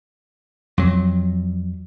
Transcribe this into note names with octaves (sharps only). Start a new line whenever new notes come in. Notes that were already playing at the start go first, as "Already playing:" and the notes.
F2 F#3